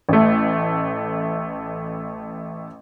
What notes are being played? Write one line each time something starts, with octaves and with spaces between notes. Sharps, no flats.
A1 A3